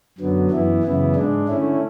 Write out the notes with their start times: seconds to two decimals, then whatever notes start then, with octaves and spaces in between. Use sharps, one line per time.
0.18 F#2 D3 F#3 B3
0.51 F#2 E3 B3 E4
0.83 F#2 C#3 E3 B3 E4
1.16 G#2 G#3 D4
1.48 D3 A3 C#4 E4